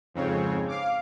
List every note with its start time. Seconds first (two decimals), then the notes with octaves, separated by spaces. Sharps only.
0.14 F2 G#2 C#3 C4 C#5
0.68 F5 D6